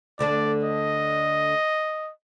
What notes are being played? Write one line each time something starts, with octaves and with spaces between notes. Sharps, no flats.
D2 D3 D4 D5
D#5